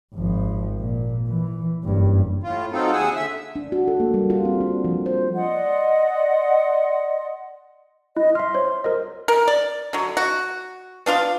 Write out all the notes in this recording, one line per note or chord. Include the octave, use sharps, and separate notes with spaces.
G#1 F3
A#2
E3
F#1 G2
A2 F4
F#3 C4 D#4 F4 A4
D#2 G#4 F#5 G#5 E6
D3 E5 E6
D4
F#4
A4
A#3
G3
F4
C4
D4
F3
C5
D5 D#5 F#5 C6
E4 D#5
E5 C6 F6
C5 C#5
A#4 C5 D#5
A#4
D5
D3 F#3
F#4
B3 D4 F4 F5